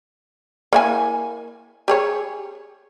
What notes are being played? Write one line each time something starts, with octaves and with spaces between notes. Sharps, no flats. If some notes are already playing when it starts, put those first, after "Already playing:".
A#3 E4 G#5
G4 G#4 C#5